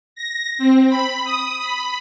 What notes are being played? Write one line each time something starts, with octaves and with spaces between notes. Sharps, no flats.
A#6
C4
B5
D#6
B5